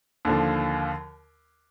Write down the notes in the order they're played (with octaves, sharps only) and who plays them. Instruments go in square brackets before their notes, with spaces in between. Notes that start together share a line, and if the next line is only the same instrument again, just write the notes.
[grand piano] D#2 D3 F3